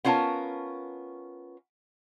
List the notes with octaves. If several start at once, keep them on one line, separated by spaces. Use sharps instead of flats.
B3 C#4 F4 A#4 A5